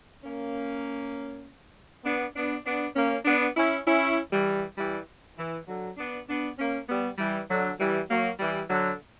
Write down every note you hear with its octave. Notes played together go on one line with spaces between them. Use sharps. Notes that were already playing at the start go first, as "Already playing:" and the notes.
A#3 C#4
B3 D4
B3 D4
B3 D4
A#3 C#4
B3 D4
C#4 E4
C#4 E4
E3 G3
E3 G3
E3
D3 F#3
B3 D4
B3 D4
A#3 C#4
G3 B3
E3 G3
D3 F#3
E3 G3
F#3 A#3
E3 G3
D3 F#3